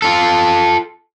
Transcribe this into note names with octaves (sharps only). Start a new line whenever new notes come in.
F4 A4